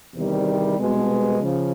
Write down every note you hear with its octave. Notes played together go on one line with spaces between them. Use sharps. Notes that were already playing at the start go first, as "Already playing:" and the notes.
E2 C3 D#3 G3
C2 B2 G#3
C#3 F3